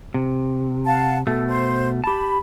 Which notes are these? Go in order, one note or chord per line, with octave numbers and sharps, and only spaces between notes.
C3
F5 F#5 A5
B2 A3 A4
C5
G4 A5 B5